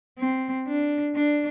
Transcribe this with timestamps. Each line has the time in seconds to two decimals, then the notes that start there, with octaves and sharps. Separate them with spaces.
0.19 C4
0.67 D4
1.15 D4